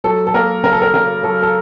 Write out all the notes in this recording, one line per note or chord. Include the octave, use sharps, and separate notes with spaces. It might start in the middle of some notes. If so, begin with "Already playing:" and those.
F#3 A4
A4
A#3 A#4
C#3 A#4
A4
A#4
C#3 A#4
F#3 A4
A4